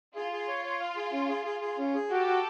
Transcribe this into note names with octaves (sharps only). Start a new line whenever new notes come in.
F4 G#4
G#4
C#5
C#5
F5
G#4
C#4
G#4
G#4
G#4
C#4
G#4
F#4 G4 A4
F#4